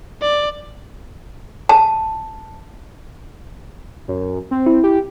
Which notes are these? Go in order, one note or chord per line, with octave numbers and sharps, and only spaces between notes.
D5
A5
F#2
C4
E4
G4